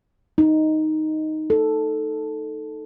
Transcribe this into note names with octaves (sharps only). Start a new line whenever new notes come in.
D#4
A4